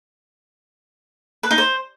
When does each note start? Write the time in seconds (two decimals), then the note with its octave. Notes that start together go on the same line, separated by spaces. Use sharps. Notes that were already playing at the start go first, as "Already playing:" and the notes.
1.43 B4
1.51 D#4
1.58 C5